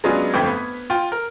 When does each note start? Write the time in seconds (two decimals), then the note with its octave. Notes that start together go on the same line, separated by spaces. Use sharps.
0.04 F#3 G#3 B3 C#4 D4 F4
0.34 G1 F2 A3 G5 G#6 B6
0.47 B3
0.90 F4 G5
1.12 A#4